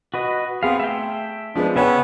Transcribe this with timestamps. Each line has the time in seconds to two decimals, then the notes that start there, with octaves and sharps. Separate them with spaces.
0.14 F#4 B4 D#5
0.63 B3 C4 G#4 F5
0.80 A3 E5 G5
1.55 F3 G#3 B3 D4
1.76 C#3 B3 B4 C#5 E5 G5 G#5